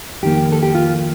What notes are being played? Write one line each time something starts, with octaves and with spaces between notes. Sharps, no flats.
F2 D#3 A#3 G4
A4
G4
F4